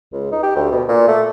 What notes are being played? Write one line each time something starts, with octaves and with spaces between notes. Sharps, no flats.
C#2
D#4
G4
D2
B2
A#2
A3